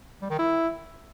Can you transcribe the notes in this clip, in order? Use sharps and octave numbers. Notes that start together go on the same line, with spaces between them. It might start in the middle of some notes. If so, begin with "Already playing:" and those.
G3
D#3
E4